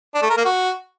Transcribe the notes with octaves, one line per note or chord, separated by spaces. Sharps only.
D4
A3
A#4
A#3
F#4